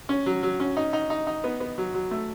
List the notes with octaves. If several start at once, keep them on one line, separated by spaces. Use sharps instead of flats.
C#4
F#3
F#3
C#4
D#4
D#4
D#4
D#4
B3
B3
F#3
F#3
A3